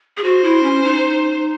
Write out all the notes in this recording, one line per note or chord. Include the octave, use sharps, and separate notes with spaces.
G#4
F#4 C5
E4
C#4
D#4